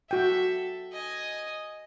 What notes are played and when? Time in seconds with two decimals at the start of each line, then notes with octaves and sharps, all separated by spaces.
0.11 F#4 A4 E5 G5
0.93 D#5 G#5